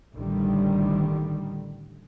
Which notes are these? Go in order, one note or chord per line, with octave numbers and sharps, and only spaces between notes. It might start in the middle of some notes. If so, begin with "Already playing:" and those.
A1 D3 D#3 G3